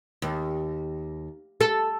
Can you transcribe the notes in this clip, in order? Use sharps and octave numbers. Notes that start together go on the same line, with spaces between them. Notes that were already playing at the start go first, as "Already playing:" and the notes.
D#2
A4